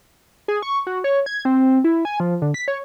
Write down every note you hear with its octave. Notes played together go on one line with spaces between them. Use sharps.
G#4
C#6
F#4
C#5
G#6
C4
E4
G#5
F3
D3
B6
C#5